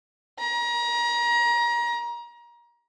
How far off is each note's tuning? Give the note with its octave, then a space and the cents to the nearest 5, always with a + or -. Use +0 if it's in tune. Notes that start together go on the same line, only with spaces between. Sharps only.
A#5 +30